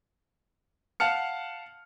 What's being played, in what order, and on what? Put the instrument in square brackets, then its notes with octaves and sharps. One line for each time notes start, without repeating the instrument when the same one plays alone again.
[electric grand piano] F5 F#5 A5 F6 C#7